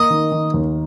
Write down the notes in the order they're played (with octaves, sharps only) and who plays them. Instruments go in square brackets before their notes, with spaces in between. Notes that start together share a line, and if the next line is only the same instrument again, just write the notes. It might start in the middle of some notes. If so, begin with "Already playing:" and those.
Already playing: [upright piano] A#3 [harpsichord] D#5
[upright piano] D#3
D#3
D#2